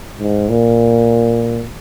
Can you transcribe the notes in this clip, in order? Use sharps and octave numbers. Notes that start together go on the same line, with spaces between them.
G#2
A#2